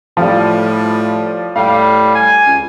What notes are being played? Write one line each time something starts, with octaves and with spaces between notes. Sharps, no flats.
A2 F3 G3
A2 G3 F5
G#5
C#2